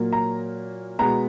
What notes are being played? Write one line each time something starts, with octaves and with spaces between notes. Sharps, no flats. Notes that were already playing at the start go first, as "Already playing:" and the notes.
Already playing: A#2 F#3 A#3
A#5
B2 G#3 B3 A#5